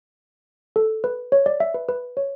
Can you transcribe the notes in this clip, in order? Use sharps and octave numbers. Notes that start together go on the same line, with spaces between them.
A4
B4
C#5
D5
E5
B4
B4
C#5